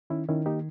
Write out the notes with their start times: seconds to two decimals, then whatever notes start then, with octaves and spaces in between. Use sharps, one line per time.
0.10 D#3 C#4 E4
0.29 D#3 C#4 E4
0.46 A#3 D#4 G4